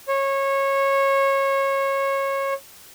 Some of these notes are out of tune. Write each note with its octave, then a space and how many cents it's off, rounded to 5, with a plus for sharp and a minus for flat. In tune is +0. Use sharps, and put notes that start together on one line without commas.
C#5 -20